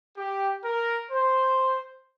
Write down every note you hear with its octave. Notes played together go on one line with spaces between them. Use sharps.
G4
A#4
C5